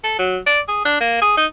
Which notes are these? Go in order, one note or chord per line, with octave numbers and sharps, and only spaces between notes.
A4
F#3
D5
G#4
D4
A#3
G#4
D#4